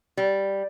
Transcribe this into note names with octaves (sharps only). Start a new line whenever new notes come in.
G3